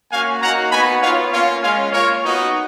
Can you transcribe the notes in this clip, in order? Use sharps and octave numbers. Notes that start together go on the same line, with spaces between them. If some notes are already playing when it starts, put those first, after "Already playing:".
A#3 C#4 F#4 F5 G#5
A#3 D#4 F#4 F#5 A#5
B3 D#4 F#4 G#5 B5
B3 F4 C#5 F5
A#3 C#4 F4 C#5 F5
G#3 C#4 F4 F5 G#5
A#3 C#4 F4 A#4 C#5
B3 D#4 F#4